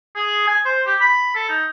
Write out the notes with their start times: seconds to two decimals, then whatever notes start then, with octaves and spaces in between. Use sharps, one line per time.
0.16 G#4
0.47 G#5
0.65 C5
0.87 G4
1.01 B5
1.36 A4
1.49 D#4